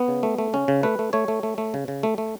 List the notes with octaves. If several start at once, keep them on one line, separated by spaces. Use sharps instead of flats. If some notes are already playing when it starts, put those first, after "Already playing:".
Already playing: B3
C#3
A3
A3
C#3 C#4
C#3
A3 B4
A3
A3 C#5
A3
A3
A3
C#3
C#3
A3
A3